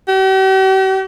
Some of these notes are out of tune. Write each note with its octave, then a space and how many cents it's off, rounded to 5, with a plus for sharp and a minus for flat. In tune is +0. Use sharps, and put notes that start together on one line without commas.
G4 -45